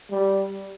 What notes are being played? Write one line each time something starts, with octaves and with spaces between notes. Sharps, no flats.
G3